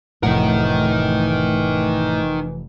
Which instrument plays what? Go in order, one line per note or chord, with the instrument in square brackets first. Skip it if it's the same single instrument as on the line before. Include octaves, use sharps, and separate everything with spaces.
[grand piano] F1 F3 [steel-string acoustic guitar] A2 F#5 [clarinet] E3 [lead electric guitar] D#4 A#4